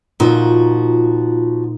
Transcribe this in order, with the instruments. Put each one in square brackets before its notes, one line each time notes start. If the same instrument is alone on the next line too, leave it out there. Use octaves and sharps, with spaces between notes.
[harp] A#2 D#4 E4 [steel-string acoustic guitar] F3 F#4